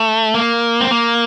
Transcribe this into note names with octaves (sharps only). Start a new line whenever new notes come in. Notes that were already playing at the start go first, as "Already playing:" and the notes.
Already playing: A3
A#3
C4
A#3